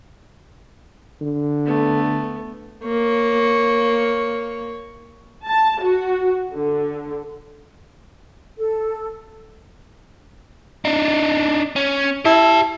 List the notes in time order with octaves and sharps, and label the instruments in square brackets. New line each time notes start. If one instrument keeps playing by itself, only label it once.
[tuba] D3
[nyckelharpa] A3 B3
[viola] A#3 C#5
[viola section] A5
F#4
D3
[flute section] A4
[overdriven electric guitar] D4 D#4
C#4
[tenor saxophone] E4 [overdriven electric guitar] G4 A5